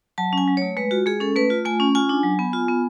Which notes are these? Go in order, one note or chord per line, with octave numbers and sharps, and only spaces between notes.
F#3 A5
C#4 G#5
F#3
A3 C#5
G#3 B4
F4 F#4
G#3 G#4
C#4 A4
A3 B4
F4
A3 G#5
C#4
F4 G#5
D4
F#3
B3
F4
B3